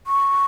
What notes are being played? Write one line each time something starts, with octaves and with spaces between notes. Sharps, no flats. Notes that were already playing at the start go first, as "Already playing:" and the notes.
C#6